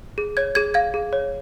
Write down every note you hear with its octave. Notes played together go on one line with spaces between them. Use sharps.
G#4
C#5 G#6
G#4 G#6
F5 G#6
G#4
C#5